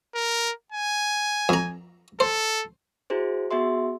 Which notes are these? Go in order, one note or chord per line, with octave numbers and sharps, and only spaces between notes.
A#4
G#5
F2 A#5
A4 C5
E4 F#4 G#4 C5
B3 F#4 G#4 E5 C6